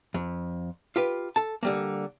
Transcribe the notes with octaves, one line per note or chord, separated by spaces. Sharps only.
F2
F4 G4 B4
A4 A5
D3 G3 A#3